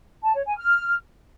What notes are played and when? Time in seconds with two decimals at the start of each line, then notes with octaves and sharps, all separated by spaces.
0.23 A5
0.35 C#5
0.46 G#5
0.57 F6